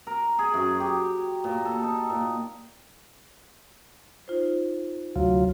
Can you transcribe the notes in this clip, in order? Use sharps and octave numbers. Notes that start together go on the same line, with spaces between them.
A#4
G#4
F#2
G4
A#2
A4
D#4
A#2
D#4 F4 C5
D2 C3 F#3 F4